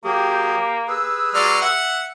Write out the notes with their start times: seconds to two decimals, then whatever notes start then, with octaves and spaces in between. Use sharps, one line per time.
0.04 F#3 A#3 G4 G#4
0.88 G4 G#4 B4 E6
1.35 F#3 G#3 D5 F6
1.61 E5 F#5